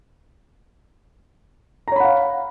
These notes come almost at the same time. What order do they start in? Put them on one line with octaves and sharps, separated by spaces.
A#5 C#5 B5 F#5 F5